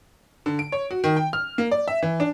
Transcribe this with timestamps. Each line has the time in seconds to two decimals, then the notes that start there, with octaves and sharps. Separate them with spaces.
0.46 D3
0.59 D7
0.72 C#5
0.91 F#4
1.04 D#3
1.17 G5
1.33 F6
1.58 A#3
1.71 D5
1.88 E5
2.02 E3
2.20 D4